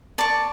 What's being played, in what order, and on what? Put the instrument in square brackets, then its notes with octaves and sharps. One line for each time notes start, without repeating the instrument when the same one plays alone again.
[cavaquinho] D5 A5 C#6